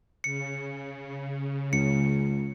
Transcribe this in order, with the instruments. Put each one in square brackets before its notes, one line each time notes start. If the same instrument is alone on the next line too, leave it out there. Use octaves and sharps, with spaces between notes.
[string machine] C#3 [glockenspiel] C#7
[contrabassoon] C#2 [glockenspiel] C#7